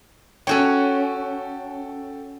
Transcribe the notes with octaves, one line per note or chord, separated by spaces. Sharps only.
C#4 F#4 A4 C#5 G5